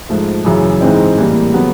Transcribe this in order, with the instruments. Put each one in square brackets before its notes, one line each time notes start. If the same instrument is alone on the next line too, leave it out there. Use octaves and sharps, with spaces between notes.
[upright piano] G#2 F3 A3
F#2 C#3 E3
G#2 E3 G#3 C4 D#4
A2 E3 G3 A#3
C#3 F#3 B3